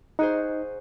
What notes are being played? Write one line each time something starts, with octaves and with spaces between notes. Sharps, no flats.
D#4 F#4 G#4 C5